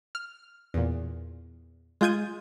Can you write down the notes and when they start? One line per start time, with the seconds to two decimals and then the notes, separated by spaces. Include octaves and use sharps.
0.15 F6
0.74 E2 A#2
2.01 G#3 F4 G6 G#6 D#7